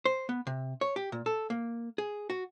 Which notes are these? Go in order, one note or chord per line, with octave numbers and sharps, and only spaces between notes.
C5
B3
C3
C#5
G4
A#2
A4
A#3
G#4
F#4